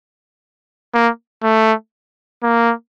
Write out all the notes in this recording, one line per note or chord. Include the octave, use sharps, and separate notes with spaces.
A#3
A3
A#3